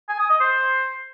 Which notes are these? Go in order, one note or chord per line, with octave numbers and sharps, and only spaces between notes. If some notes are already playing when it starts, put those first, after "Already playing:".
G#5
D#6
D#5
C5